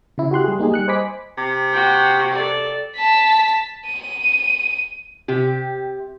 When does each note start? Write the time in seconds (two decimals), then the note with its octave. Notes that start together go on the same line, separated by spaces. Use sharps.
0.18 C#3 E4
0.31 F#4 G4 C6 F#6
0.44 G3 G#4
0.59 A#3 D#4 G4 G#4
0.72 G3 F#6 C#7
0.88 C5 D#5 G#5 B5 D6 B6
1.37 C3
1.73 F#4 G5
2.32 A4 D5
2.96 A5 B6
3.87 D#7
5.28 C3 G4